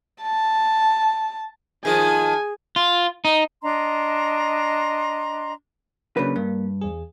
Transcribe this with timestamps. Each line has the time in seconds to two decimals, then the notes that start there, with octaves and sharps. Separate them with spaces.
0.22 A5
1.85 D#3 F3 G#4 G#5
2.76 F4
3.25 D#4
3.62 D4 D#5 A#5 C6
6.17 C#3 F#3 A#3 D4 B4
6.36 G2 A#3
6.81 E2 G#4